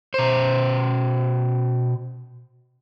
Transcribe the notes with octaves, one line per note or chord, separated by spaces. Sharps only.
B2 C5